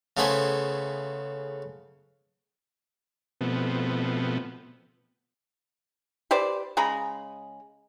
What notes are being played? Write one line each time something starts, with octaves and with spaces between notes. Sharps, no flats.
C#3 A3 B3 G#4 C5 E5
B2 F3 A3 B3 C4
G4 B4 C5 D5
C#3 G#3 A#5 B5